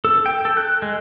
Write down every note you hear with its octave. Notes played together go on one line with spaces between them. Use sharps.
A4
G5
A4
F#6
G#3